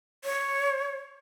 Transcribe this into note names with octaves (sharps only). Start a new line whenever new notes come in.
C#5